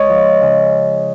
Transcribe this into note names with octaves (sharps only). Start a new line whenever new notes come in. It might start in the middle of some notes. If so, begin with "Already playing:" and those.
Already playing: G#3 C#5 D#5
F3
C#3